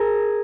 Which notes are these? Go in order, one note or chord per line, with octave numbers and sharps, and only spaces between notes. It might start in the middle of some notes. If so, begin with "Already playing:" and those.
Already playing: G#4 A#4